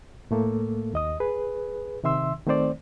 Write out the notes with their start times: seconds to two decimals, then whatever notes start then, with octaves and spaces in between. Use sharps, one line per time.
0.31 A2 A3 A#3 A4
0.93 D#2 D#5 D#6
1.20 G#4 B4
2.04 C3 D#3 E5 C6 E6
2.47 D#3 A3 C4 C5 D5